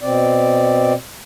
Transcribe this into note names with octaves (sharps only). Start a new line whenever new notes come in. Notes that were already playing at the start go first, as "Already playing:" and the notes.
B2 C4 D5